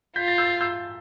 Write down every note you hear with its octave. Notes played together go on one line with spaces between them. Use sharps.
F4 G6 B6
A6
E6 G6
E6 G6